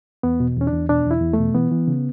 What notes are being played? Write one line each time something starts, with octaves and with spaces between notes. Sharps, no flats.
E2 B3
B2
E2 C#4
D4
E2
B2 D4
E2 E4
E2
A3
B2
E3 B3
E3
C#3